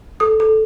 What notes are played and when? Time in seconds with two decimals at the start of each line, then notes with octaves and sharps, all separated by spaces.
0.20 A4 D#6
0.40 A4